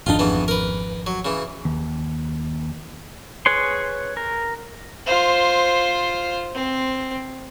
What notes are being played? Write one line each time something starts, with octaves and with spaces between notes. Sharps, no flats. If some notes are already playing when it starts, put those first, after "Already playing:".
G#1 F2 D4 D#4 F4
C#3 E3 B3
A#4 B4
F#3
C#3 E3
D#2
G#4 B4 C#5 C6
A#4
F4 C5
C4